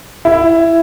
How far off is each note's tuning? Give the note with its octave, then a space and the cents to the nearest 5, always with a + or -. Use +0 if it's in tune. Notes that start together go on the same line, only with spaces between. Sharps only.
E4 +10